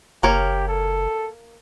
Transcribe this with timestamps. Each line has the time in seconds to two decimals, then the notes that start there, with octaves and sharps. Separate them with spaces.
0.23 F#1 A#3 G4 A#4 C#5
0.68 A4